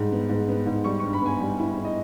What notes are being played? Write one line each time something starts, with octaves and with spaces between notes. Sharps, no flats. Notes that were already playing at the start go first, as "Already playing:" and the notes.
Already playing: G#2 G3
B3
G#2
B3
G#2
G3 C#6
G2 C#6
B5
B3 G#5
G3
E4
E4
D#5